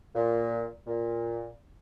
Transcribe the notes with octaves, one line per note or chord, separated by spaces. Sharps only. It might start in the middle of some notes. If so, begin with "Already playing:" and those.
A#2
A#2